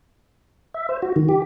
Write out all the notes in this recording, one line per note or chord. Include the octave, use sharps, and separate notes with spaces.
E5
C5
F#4
D#3
G4